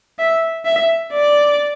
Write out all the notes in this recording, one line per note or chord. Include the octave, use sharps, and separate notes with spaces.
E5
E5
D5